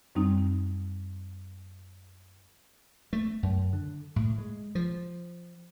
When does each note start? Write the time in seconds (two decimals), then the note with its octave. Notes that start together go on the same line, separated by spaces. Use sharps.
0.15 F#2 G3 C4 D#4
3.13 A3
3.43 F#2
3.73 D3
4.16 A2
4.38 G#3
4.75 F3